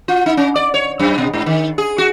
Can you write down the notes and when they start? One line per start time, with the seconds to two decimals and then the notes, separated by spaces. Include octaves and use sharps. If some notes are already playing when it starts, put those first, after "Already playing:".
0.08 F4
0.26 D#4
0.37 C#4
0.56 D5
0.74 C#5
1.00 F#2
1.18 B2
1.34 G#2
1.46 D#3
1.78 G#4
1.98 F#4